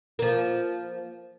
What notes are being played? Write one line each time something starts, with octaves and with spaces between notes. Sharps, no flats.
F3 A#3